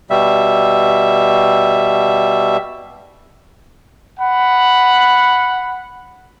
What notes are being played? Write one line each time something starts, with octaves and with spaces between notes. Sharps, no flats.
B2 G3 E5
F#5 B5